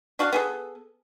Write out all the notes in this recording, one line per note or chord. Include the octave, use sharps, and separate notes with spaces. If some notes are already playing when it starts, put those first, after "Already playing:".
D4 F#4 F5 A5
B3 G#4 A4